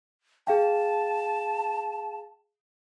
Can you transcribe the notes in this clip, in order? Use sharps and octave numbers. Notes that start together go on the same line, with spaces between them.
G#4 F5 G5 A5